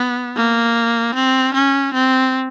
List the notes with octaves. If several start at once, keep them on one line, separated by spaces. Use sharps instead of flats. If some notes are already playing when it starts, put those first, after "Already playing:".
Already playing: B3
A#3
C4
C#4
C4